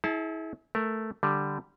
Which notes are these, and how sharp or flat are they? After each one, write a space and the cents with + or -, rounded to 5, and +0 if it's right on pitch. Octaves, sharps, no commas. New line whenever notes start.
E4 -30 G#4 +30 A5 +0
A3 +0 A#4 +0
D3 +0 G3 +0